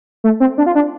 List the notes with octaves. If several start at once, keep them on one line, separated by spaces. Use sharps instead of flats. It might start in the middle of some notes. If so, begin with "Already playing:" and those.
A3
C4
D4
F4
D4